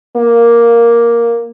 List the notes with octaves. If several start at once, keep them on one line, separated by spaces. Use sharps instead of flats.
A#3